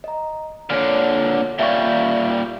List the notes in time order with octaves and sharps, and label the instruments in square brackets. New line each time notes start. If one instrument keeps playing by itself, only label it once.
[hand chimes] D#5 A#5
[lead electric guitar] A#2 D3 [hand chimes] C#5 G#5 F6
[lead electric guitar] A#2 G3 [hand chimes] E5 F5 C#6